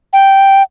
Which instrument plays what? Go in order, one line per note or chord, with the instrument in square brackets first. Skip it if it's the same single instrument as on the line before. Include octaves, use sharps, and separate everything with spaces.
[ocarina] G5